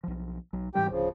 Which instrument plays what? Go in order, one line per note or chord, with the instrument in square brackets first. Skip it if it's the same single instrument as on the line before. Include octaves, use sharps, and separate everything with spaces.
[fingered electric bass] B1 F3
B1 F#3
[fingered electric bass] G#2 E3 G3 [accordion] G4 G5
[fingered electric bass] D1 [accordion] C#3 F3